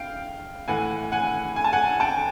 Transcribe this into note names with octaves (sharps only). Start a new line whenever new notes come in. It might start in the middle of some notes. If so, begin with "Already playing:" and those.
Already playing: F5 G5
A2 E3 F#5 G#5
F#5 G#5
G#5
A5
F#5 G#5
G5 A5